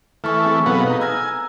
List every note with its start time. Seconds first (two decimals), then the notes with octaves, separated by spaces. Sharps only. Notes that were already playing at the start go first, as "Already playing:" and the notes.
0.24 E3 A3 G#5 C#6 F6
0.46 C4 G#4
0.66 B2 F#3 B3 A4 B4 F5
0.86 D#4 A#5 F#6
1.01 G#5 E6 F6 A#6